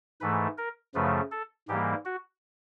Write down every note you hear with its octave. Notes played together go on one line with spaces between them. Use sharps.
G#2 E3 A3 B4
A#4
F#2 C#3 F3 A3 B4
A4
G#2 E3 G3 A#3 G4
F#4